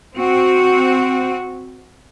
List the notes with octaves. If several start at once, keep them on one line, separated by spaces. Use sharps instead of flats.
C4 F#4